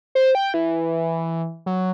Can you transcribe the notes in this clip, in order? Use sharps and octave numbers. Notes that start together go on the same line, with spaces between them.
C5
G5
E3
F#3